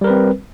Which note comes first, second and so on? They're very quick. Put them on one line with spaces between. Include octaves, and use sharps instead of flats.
G3 A#4 B4 C4